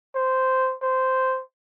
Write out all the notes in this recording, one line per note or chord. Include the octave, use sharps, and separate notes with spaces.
C5
C5